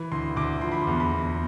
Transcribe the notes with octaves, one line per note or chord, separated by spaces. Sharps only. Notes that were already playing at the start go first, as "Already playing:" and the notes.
Already playing: E3
D2 C6
D2 D6
F3 C6
B5
C6
E2
B5
E2